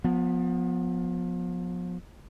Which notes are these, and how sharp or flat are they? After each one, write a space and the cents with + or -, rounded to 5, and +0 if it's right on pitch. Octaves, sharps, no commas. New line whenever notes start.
F3 +35 B3 +0